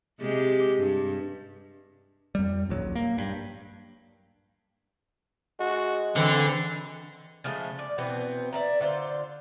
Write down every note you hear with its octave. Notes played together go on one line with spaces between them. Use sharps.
C3 G#3 G4
G2
F2 G3
D#1 A#1 F#3
A#3
G2
G#3 F#4
D3 E3 C4
C#3 F3 G#3 A3
D5
B2 E3 B3 C4
D5 E5 A#5
D3 F4 C5